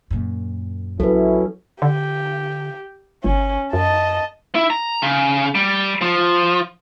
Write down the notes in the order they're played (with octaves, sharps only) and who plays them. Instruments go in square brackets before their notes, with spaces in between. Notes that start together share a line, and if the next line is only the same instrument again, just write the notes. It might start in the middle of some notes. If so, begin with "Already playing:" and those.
[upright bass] F#2 A#2
[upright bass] A#1 C4 [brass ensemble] F#3 C#4 E4 [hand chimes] A4 B4
[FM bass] D3 [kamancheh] G4
[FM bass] G1 [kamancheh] C#4
[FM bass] F#2 [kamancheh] D#5 A5
[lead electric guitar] E4
A#5
C#3
G3
F3